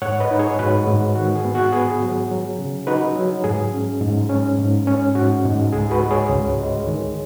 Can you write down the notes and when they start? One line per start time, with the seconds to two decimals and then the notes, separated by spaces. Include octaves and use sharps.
0.02 G#2 C#5 F#5
0.20 B4 D#5
0.31 D#4
0.39 G#4 C#5
0.59 G#2 F#4 B4
0.87 G#2
1.16 D#3 F#4
1.35 G#4
1.45 B3
1.55 F#4
1.73 B3 G#4
2.02 F#3
2.31 F#3
2.59 C#3
2.87 D#4 F#4 B4
3.16 F#3
3.44 G#2 G#4
3.73 C#4
4.01 G#2
4.29 C#4
4.59 G#2
4.87 C#4
5.15 G#2 F#4
5.45 G#2
5.72 C#2 G#4
5.91 F#4 B4
6.01 G#3
6.11 G#4 C#5
6.29 C#2
6.58 G#3
6.87 D#3